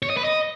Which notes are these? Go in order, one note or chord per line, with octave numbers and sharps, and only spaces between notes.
C#5
D#5
B4
D#5